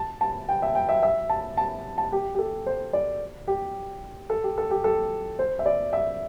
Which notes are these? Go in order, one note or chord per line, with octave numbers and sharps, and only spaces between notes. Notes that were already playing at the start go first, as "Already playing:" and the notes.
Already playing: A5
A5
G5
E5
G5
E5
E5
A5
A5
A5
G4
G4
A4
C5
D5
G4
A4
G4
A4
G4
A4
C5
E5
D5
E5